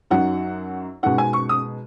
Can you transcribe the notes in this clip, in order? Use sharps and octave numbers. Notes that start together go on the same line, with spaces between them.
F#2 F#3 D#4 F#5
B2 G#3 D#4 F#5
G#5
C#6
D#6